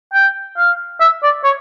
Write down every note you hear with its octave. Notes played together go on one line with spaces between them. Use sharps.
G5
F5
E5
D5
C#5